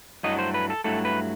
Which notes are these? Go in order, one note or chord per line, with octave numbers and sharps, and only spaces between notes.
G2 F#3 A3 E4 D#5
C5
B4
A4
G2 F#3 A3 E4 A4
B4